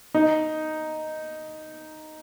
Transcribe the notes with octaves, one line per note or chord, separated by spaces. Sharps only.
D#4